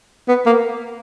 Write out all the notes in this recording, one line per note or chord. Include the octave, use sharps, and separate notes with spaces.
B3
A#3